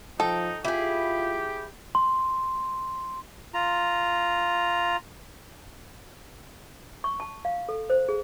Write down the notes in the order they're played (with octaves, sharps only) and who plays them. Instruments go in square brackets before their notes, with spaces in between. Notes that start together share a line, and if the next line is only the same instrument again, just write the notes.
[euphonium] F3 [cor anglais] D#4 [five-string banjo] A4 [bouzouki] G5
[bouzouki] E4 G#4 [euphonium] F4 [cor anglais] G4
[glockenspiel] C6
[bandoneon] F4 A#5
[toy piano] C#6
A5
F5
A4
C5
G#4